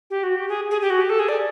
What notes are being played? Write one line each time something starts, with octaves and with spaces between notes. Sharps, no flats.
G4
F#4
G4
G#4
G#4
G4
F#4
G4
A4
G#4
D5